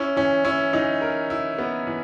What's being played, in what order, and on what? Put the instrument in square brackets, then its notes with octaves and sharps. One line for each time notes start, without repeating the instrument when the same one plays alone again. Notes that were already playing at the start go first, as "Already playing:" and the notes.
Already playing: [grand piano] C#4 [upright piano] E4
[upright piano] E3 [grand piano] C#4
[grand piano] C#4 [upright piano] E4
[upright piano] E3 [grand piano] D#4
[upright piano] A#4
E4
B3
E3